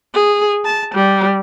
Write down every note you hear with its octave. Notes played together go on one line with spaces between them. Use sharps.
G#4
A5
G3